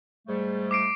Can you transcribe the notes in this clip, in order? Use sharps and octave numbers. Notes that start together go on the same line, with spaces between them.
G#2 G3 A3
D6 C7 D7